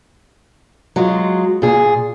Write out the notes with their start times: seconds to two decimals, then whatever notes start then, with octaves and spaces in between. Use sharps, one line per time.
0.96 F#3 G#3 F4
1.62 A#2 G#4